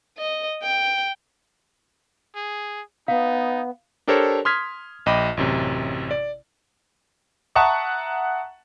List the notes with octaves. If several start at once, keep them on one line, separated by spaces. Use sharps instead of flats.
D#5
G5
G#4
B3 D#4 F5
D4 G4 A4 A#4 C5 C#5
C6 D#6 F6 G#6 B6
A#1 D#5 G5 B5 D6
A1 F#2 C3
D5
E5 F#5 A5 A#5 C#6 D#6